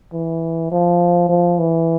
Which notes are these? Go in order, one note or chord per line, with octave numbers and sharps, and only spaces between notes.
E3
F3
F3
E3